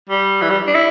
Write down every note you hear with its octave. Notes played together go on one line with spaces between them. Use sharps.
G3
E3
G3
D4
E4